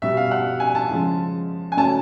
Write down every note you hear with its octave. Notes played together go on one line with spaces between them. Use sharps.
B2 G3 E5
F5
F#5
G#5
A5
C#3 F3 G#3
G#5
C#3 F#3 A3 A5